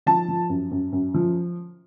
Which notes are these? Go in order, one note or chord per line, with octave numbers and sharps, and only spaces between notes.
F3 A5
F3
F#2
F#2
F#2
F3